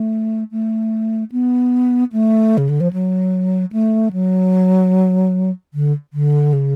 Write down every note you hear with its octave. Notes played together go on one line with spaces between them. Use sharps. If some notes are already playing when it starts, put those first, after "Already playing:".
Already playing: A3
A3
B3
A3
C#3
D3
F3
F#3
A3
F#3
D3
D3
C#3